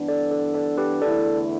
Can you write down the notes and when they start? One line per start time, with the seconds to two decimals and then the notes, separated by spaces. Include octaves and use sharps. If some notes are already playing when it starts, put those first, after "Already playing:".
Already playing: G2 E3 B3 D4
0.08 A4 D5
0.31 A4 D5
0.54 A4 D5
0.78 G4 B4
1.01 E2 D3 A3 E4 A4 D5